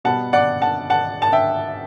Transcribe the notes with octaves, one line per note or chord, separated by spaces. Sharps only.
B2 G3 B3 F#5 A5
D5 F#5
F#5 A5
F#5 A5
A5
E5 G5